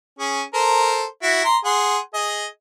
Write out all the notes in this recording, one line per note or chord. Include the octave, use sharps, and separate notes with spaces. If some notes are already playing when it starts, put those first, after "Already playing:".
C#4 G#4
A4 A#4 C5
E4 F#4
A#5 C6
G#4 F#5 C6
G#4 D#5